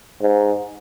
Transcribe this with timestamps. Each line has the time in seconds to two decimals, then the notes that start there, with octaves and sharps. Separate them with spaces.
0.22 G#2